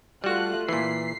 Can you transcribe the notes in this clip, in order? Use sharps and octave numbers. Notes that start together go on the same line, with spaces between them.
G3 A3 F4 F#4 F#6
A#2 E3 B6 C7